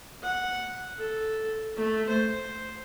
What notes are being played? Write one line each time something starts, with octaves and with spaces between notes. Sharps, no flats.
F#5
A4
A3
C5